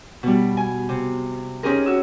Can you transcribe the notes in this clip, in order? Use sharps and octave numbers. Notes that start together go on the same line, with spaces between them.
B2 G3
G#5
C3
C4 C#4 D#4 G4 G#4 A#4
F#4 E6